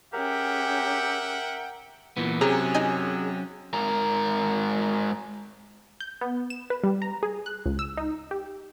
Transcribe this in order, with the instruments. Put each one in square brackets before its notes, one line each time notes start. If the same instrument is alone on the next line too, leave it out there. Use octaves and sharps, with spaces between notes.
[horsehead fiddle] C#4 G#4 [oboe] G4 [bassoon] A#4 [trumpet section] E5 F#5 G5
[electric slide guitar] A#2 E3 B3
[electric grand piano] C3 [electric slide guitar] F#3 C#4 [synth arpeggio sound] G#4 [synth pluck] A#5
[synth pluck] D#4 D#5 G#5
[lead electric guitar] G#2 A#4
[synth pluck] G6
B3
E7
B4
G3
A#5
G#4
F#6
C#2
E6
D#4
G4